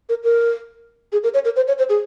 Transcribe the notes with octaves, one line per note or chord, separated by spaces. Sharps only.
A#4
A#4
G#4
A#4
C#5
A#4
C5
C#5
C5
G#4